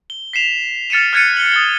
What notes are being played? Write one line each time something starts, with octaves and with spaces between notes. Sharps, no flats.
G7
B6 C7 E7 F7
F6 A6 C#7 D#7 E7
F6 F#6 G#6 A6 C#7 D#7
F#7 G7
D#6 A6 G7